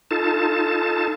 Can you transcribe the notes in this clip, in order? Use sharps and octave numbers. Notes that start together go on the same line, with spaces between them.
D#4 F4 A4 A5